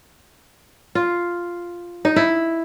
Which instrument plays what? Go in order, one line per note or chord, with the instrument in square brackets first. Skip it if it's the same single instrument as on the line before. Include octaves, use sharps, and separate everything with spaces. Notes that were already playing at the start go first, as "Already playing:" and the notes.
[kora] F4
D#4
E4